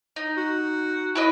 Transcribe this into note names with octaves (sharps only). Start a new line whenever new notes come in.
D#4
F#4
E4 B4 D#5